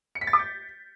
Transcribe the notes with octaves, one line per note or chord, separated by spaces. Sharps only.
C#7
B6
A6
D6
G6